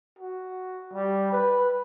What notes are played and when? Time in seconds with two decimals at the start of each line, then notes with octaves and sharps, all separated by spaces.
0.19 F#4
0.93 G3
1.32 B4